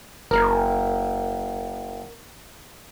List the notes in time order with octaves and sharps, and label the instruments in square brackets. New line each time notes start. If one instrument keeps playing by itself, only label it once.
[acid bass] F#1 [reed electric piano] A#4